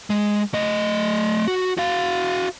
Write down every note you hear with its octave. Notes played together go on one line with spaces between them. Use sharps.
G#3
A3 D#5
F#4
F#4 F5